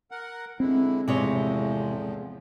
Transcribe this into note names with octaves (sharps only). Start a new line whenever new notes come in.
A#4 F#5
D3 G#3 C4 E4
E2 A2 C3 F3 G#3 C#5